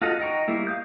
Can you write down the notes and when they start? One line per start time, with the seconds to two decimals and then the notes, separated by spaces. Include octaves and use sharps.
0.02 F4 F#4 A4 D#5 F#5
0.20 D#4 D#5 G5 A#5 C#6
0.48 G3 A#3 E4
0.67 F5 D#6 G6